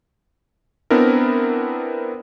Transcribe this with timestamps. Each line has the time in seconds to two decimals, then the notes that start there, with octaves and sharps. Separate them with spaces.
0.90 B3 C4 D4 E4 A#4